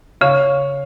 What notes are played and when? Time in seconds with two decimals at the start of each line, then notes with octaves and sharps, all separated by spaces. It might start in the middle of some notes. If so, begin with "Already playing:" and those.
0.21 C#3 C#5 F5